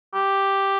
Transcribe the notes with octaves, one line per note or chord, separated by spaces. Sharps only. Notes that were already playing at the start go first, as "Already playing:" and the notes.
G4